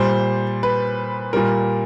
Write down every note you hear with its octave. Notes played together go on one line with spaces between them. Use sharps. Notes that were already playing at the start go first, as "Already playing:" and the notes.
Already playing: A#2 G3 C5
B4
A#2 G3 A#4